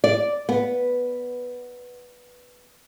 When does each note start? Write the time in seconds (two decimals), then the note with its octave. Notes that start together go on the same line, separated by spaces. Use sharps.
0.04 D5
0.49 B3